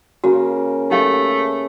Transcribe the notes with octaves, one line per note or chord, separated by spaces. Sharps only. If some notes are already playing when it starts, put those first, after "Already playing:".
C#3 A#3 F#4
A3 D#4 G4 F5